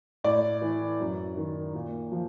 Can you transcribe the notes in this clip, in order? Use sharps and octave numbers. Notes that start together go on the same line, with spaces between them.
A2 D5
E3
F#2
D#3
A#2
F3